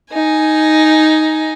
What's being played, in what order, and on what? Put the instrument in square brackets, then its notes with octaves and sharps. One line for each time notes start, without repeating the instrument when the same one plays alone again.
[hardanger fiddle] D#4 G#5